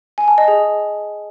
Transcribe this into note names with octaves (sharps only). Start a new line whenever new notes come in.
G#5
A5
D#5
G#4